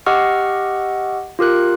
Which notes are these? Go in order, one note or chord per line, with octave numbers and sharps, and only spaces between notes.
G4 D#5 F#5 C#6 E6 F6
F4 G4 A#4 F#6